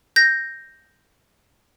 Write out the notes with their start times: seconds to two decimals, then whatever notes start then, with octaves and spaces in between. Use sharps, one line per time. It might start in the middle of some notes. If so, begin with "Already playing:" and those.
0.16 G6 A#6